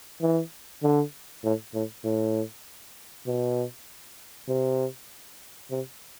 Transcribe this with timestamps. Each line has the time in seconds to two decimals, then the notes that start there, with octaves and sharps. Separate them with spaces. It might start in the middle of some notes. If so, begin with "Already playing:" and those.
0.22 E3
0.83 D3
1.44 A2
1.74 A2
2.05 A2
3.27 B2
4.49 C3
5.71 C3